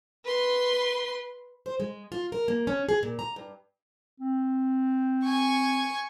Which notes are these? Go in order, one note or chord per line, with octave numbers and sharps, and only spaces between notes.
B4 C6
C5
G#3
F4
A#4
A#3
C#4
G#4
A#2
A#5
G2
C4
G#5 C#6